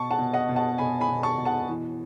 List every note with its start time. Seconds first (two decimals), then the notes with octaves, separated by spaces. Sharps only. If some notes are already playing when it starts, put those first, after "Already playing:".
Already playing: B2 A5 C#6
0.11 F#5 A5
0.18 B2
0.33 D#5 F#5
0.49 B2
0.56 F#5 A5
0.78 B2 G#5 B5
1.01 G#5 B5
1.08 B2
1.23 A5 C#6
1.38 B2
1.45 F#5 A5
1.68 E3